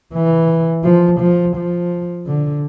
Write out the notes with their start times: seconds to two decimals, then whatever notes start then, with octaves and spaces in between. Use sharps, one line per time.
0.14 E3
0.84 F3
1.20 F3
1.56 F3
2.26 D3